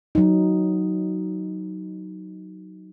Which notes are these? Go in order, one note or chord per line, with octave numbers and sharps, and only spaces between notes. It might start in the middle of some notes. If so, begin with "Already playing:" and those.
F#3 D#4